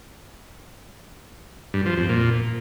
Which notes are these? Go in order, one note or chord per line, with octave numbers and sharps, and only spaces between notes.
G2
F3
F2
A#2